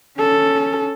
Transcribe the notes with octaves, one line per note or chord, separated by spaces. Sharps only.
C#4 A4